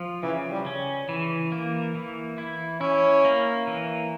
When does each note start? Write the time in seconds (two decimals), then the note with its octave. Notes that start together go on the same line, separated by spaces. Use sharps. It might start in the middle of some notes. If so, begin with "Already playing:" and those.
Already playing: F3 F4
0.23 C#3 E3
0.51 G3
0.66 C#4
1.09 E3
1.52 A#3
1.95 E3
2.38 E4
2.81 C#4 E4
3.25 A#3
3.67 E3